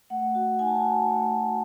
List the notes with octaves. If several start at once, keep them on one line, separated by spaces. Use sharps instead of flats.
A3 F#5
F#4
D#4 G#5
A5
G#5
F#4
A3
F#4